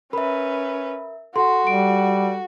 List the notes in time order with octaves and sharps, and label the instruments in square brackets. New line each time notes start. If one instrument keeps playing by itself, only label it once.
[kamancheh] C#4 B4 [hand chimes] A#4 E5 [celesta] B5
[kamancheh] F#4 [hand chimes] A4 F#5 [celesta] C6
[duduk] G3 [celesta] D7